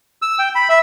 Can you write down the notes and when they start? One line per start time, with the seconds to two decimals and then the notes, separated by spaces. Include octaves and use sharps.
0.22 E6
0.39 G5
0.55 B5
0.69 E5